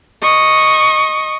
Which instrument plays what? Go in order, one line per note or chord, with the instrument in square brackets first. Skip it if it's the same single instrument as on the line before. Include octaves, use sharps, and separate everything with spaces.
[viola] D#5 C#6